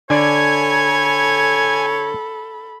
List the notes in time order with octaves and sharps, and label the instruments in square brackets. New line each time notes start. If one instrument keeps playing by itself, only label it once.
[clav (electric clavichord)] D3 D4 D5 [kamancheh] A4 B5 [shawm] C#5 [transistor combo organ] G#5